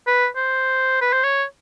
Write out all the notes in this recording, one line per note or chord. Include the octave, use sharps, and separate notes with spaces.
B4
C5
B4
C5
C#5